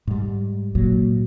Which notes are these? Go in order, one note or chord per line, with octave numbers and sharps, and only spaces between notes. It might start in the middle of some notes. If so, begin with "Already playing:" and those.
G#2 G3
A#2 F#3